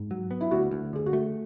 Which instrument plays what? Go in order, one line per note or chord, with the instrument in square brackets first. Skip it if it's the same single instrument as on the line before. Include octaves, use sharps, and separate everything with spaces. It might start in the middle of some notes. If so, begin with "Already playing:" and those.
Already playing: [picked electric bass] G#2
F#3
B3
[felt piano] E4
[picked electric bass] D2 [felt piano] F#4
[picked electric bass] D2
[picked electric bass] D3 [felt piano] G#4
[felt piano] F#4
[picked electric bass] A3